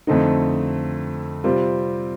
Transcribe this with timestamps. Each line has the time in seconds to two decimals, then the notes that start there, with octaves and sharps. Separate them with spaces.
0.07 F2 D3 A3 C4 D#4
1.44 C3 G3 C4 F4